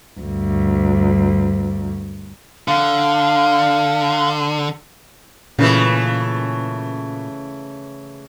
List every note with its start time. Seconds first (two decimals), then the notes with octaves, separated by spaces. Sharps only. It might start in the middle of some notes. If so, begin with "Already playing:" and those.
0.19 D2 G2
2.68 D3 F5
5.59 A#2 C#3 E3 A3